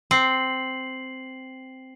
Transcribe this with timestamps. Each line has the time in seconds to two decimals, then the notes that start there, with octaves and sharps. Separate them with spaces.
0.11 C4 C7 F#7